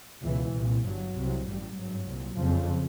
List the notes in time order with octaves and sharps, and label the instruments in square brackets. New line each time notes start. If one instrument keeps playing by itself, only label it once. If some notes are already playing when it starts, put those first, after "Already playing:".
[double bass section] C#2 B2 E3
C2 A#2
G2 F#3
G1
C2 C3
A1 G2 G3
G#1 G2 F#3
C2 A#2
F#1 F2 C#3 F3